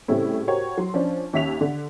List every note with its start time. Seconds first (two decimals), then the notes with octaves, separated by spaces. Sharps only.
0.08 A2 C#3 G3 C4 C#4 E4
0.47 F#4 G4 A#4 C5 C#5
0.78 F#3 C6
0.94 F3 C#4 D4
1.33 D#2 C#4 E5 B6 F7
1.61 D3